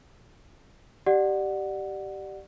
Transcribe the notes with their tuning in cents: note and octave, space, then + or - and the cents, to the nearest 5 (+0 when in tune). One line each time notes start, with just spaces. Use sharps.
G4 -15 D5 +20 F#5 +0